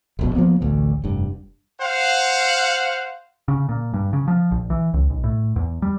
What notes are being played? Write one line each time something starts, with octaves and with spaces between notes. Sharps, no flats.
E1 A#1 B2
F3 F#3 A#3 B3
A1 D2
F1 G2
C5 F5 F#5
C#3
A#2
G2
C#3
F3
A#1
E3
C#2
B1
A2
E2
G3